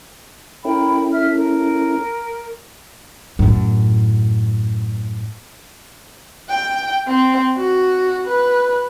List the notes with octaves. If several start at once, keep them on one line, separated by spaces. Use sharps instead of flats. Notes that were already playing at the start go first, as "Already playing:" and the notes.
C#4 E4 A4 A#4 G5 B5
E5 F6
A#4
F#2 A2
G5
C4
F#4
B4